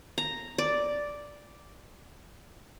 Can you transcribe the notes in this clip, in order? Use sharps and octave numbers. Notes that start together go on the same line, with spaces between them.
A#5
D5